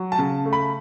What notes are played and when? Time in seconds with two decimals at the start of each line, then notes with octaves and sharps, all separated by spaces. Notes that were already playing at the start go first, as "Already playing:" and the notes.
Already playing: F#3
0.12 A5
0.18 C#3
0.45 A3
0.53 B5